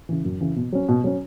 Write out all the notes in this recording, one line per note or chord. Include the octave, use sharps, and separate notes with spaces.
C#3 E3
F#2
C#3 E3
B2
F#3 C#4
B2
F#3 C#4